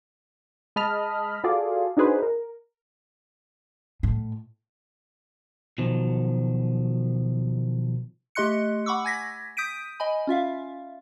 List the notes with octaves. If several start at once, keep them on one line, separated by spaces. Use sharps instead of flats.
G#3 D#5 A5 B5 F6
F4 F#4 G#4 A4 D5 F5
D4 D#4 F#4 G#4 B4 C5
A#4
A2
B2 D#3 F3 F#3
A3 G4 D#5 C6 F#6 C#7
F#5 B5 C#6 D6 E6
G#5 G#6 A#6 B6
D#6 G6 B6 D7 D#7
D#5 G#5 B5
C#4 F4 E5 F5